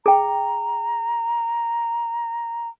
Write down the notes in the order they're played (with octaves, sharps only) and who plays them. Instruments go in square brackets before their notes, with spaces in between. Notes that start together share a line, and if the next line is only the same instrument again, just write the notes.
[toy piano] G#4 G5 [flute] A#5